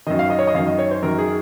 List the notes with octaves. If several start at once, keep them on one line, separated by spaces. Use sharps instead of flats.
F#2 D#3 D#5
F5
D#5
C#5
D#5
F#2 D#3 F5
D#5
C#5
C5
F#2 D#3 A#4
G#4